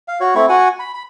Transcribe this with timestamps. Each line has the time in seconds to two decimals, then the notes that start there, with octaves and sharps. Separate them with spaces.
0.08 F5
0.20 F#4 C#5
0.35 A3 C4 E4 C#6
0.49 F#4 F#5 G#5
0.80 B5
0.94 B5